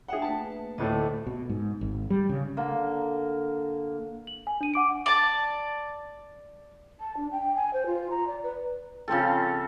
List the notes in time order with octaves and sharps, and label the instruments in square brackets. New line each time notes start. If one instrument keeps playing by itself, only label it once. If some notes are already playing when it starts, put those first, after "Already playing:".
[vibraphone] D4 E5 G5 [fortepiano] G#4 F#5
[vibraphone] A3 A#3 B4 [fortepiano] A5
[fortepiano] D2 A2 A3 [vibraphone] D#5 A5 D6
[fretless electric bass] B2
G#2
G#1
G3
C#3
[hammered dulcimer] D3 A#3
[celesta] F#7
G#5
D4 D#7
F#5 D6 D7
[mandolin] D5 A5
[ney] A5
D4
G5
G#5
C5
F4
A#5
D5
B4
[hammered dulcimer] C#3 F3 C4 A4